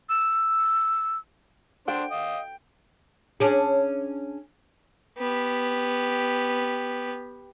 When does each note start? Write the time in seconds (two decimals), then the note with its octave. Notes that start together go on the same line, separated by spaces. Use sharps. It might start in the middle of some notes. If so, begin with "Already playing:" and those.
0.09 E6
1.88 D4 C5 G5
2.11 D#5 F5
3.40 C#4 D4 G#4
5.17 B3 G4